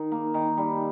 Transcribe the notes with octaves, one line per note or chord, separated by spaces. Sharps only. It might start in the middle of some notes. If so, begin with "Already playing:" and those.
Already playing: D#3 D#4
A#3
D#3
G3